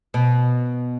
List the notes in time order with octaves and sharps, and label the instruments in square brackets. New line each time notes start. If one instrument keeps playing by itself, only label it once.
[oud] B2